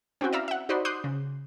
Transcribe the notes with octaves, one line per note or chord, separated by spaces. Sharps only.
C4 C#4 E4 F#4 G5
D5 E5 F5 A#5
E5 F#5
D#4 F#4 C5 D5 B5 C6
C6 D6 D#6 F#6 G6 C7
C#3